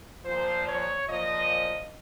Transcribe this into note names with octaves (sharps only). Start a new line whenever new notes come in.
A#2 F3 C5
C#5
A#2 F3 D#5